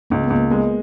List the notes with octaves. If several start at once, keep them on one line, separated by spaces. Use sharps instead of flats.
C#2 A#3
B3
C#2
A#3
G#3 B3